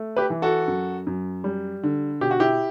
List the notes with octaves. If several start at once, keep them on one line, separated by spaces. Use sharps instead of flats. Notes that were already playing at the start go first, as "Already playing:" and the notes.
Already playing: A3
G4 B4
E3
F#4 A4
F#2
F#2
G3
D3
B2 G4
F#4
E4 G4